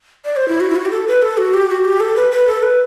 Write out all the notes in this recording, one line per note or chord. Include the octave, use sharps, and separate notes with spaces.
D5
C5
E4
F#4
E4
F#4
G4
A4
B4
A4
F#4
G4
F#4
G4
A4
B4
B4
A4
B4